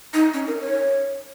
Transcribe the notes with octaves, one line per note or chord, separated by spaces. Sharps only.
D#4
C#4
A#4
C#5